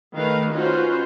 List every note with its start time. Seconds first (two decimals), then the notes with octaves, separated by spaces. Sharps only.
0.14 D#3 A3 A#4 B4 F5
0.51 C#4 D#4 F4 F#4 B4 C5